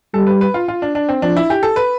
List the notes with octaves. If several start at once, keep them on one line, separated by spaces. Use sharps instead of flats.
G3 A4
B4
B4
F4
F4
D4
D4
C4
F3 D4
E4
G4
A4
B4